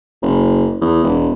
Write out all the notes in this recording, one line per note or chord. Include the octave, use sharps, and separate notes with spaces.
F#1
E2
E1